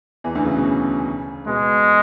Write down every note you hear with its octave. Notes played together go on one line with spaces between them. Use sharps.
E2 E3
D2 D3
C#3
B2
C#3
B2 G#3 B3